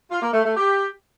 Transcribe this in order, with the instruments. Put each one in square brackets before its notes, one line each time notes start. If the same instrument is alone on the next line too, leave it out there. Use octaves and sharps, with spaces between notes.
[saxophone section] F4
A#3
A3
A3
G4